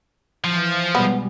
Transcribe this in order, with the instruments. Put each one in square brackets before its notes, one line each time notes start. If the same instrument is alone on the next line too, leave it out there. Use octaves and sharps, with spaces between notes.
[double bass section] E3 [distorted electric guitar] F3
[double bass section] B2 G3 G#3 [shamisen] B3